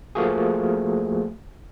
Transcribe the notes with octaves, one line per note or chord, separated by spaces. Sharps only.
F3 A3 A#3 F#4 G#4